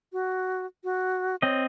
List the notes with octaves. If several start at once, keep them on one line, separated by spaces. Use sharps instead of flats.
F#4
F#4
C4 C#5 D#5